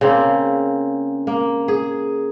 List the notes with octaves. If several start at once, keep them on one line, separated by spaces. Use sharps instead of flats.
C#3 A#3 C4
A#3
G#4